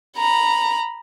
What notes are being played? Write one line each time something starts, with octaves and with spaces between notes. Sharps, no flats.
A#5 B5